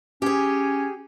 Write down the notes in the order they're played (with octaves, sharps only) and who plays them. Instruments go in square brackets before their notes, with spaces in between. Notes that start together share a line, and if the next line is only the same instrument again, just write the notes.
[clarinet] C#4 [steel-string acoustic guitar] G4 G#4